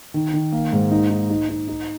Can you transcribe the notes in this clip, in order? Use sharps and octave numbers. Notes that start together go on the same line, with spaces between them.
D#3
D#3
A#3
G#2
D#4
D#4
D#4
D#4
D#4